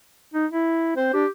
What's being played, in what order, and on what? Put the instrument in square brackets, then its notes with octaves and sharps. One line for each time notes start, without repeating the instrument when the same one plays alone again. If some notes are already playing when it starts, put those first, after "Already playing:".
[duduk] D#4
E4
[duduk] C4 [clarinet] C5
[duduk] D4 [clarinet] G4